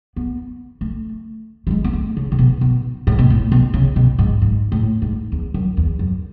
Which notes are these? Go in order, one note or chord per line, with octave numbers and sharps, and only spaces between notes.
B3
A3
F#3
G#3
B3
A3
C#3
C#3
B2
B2
A2
B2
A2
B2
C#3
B2
G#2
G#2
A2
G#2
E2
F#2
E2
F#2